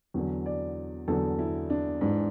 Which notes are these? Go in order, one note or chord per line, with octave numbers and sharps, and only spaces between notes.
E2 D3 F#3
D5
E2 D3 F#3 A4
E4
D4
G#2 E3 D4